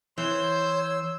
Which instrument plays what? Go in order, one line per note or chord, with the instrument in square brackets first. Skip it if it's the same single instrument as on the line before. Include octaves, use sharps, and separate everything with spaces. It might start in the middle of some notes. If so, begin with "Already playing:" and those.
[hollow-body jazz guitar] E3 [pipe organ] C5 G6 [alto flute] C#5 [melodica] E6